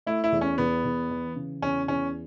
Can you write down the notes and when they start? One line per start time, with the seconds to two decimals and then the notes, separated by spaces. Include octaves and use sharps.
0.07 A3 E4
0.24 E4
0.32 E2
0.41 C#4
0.58 E2 B3
0.85 E2
1.10 E3
1.35 C#3
1.62 E2 C#4
1.88 E2 C#4